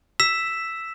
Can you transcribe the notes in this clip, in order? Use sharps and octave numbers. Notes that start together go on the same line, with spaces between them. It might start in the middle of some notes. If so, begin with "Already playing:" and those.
E6 B6 E7